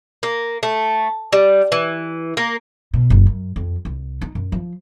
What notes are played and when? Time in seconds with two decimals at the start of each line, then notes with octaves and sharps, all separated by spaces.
0.23 A#3
0.63 A3
1.33 G3
1.72 E3
2.37 A#3
2.94 B2
3.10 F#1
3.26 F#2
3.56 F2
3.85 C2
4.21 D#4
4.35 F#2
4.52 F3